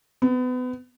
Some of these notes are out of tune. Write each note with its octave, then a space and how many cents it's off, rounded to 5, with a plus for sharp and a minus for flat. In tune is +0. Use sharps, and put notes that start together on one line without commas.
B3 +30